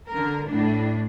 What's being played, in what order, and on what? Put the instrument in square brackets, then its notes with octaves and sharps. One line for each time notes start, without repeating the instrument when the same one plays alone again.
[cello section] D3 A#4
A2 D4